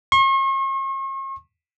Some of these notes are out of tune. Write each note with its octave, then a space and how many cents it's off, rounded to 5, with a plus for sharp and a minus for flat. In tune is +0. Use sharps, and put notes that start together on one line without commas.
C#6 -45